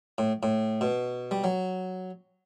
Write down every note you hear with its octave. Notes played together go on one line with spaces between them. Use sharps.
A2
A2
B2
G3
F#3